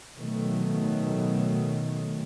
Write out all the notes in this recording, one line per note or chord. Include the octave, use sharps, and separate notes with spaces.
B2 D#3 F#3 A3